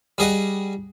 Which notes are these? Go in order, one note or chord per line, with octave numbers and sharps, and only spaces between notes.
G3 G#4 D#5 F#5